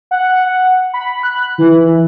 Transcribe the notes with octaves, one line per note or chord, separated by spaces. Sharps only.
F#5
B5
F#6
E3